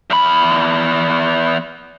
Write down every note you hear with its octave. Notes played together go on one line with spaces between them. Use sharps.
E2 B5